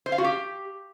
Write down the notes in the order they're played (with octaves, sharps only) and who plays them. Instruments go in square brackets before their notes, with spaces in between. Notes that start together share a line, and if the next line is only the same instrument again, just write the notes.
[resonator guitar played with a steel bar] C5
F5
F#4
G4